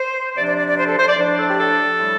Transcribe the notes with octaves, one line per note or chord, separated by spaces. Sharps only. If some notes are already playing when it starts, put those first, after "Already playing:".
Already playing: C5
C3 F3 D4 D5
D5
D5
D5
C5
A4
C5
D5
A2 F3 D4
C5
A4
G4
A4
A2 G3